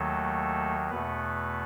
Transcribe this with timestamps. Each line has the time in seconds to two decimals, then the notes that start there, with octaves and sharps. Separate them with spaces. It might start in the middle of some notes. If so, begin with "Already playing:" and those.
Already playing: D#2 D#3 F#3 A3 A4
0.90 E2 B2 A3 B3 B4